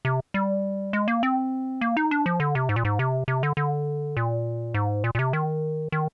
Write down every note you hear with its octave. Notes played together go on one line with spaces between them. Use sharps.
C3
G3
G#3
A#3
C4
A#3
D#4
D4
F3
D3
C3
G#2
A#2
G#2
C3
C3
D3
D3
A#2
G#2
A#2
A#2
C3
D#3
D#3